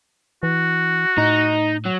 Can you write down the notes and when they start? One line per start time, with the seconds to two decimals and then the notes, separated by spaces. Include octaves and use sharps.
0.43 E3 F#4
1.18 A2 D#4
1.86 F#3